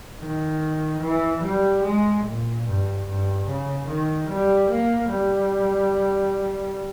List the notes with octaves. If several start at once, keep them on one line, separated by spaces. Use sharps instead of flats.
D#3
E3
G3
G#3
A#2
G2
G2
C#3
D#3
G3
A#3
G3